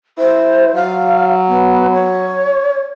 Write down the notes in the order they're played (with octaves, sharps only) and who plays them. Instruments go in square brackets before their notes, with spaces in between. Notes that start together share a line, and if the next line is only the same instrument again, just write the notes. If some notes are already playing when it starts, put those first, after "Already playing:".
[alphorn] E4 [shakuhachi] C5
[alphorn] F#3 [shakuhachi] F5
[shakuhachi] B3
C#5